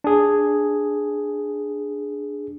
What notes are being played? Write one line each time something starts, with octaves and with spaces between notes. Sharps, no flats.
D4 G#4